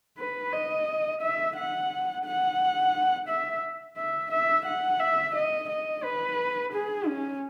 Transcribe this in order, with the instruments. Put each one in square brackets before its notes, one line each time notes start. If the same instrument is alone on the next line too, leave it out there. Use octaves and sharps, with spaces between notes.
[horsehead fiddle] B4
D#5
E5
F#5
F#5
E5
E5
E5
F#5
E5
D#5
D#5
B4
G#4
C#4